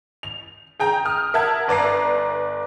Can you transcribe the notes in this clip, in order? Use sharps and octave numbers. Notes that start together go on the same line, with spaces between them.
F7
G#4 G5 A#5 G6
D#6 F6
A#4 E5 F#5 A5 E6 G#6
G1 B4 D5 A#5 C7